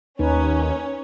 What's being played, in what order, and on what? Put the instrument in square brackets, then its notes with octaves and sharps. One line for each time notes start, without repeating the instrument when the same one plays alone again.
[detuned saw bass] D#2 [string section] C#4 [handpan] D#4 B4